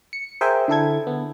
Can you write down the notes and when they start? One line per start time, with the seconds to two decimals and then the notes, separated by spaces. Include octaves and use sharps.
0.13 C#7
0.41 G#4 A#4 C5 E5 G5 G#5
0.68 D3 E4 A4 G#6
1.07 B3